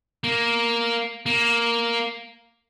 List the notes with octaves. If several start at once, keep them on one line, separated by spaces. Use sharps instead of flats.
A#3
A#3